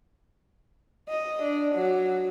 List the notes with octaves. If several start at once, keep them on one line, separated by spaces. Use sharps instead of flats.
D#5
D4
F#3